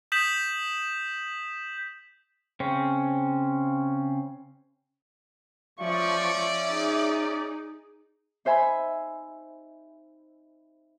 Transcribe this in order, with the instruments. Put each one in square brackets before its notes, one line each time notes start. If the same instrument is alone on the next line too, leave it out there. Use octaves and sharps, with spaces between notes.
[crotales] D#6 G6 B6 E7 F#7
[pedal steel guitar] C#3 C4 C#4
[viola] F3 C#6 [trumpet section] C#4 D5 [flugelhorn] E5
[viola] D#4 G#4
[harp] D#4 C5 E5 G#5 B5